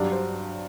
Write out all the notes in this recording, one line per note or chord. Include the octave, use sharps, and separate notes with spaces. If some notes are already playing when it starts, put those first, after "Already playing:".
Already playing: G2 F#3 D4
C5